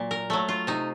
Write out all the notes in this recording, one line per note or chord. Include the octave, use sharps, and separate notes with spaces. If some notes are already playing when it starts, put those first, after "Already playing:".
Already playing: A#2 F#3
A#4
F#3 A3
F4
C3 D#4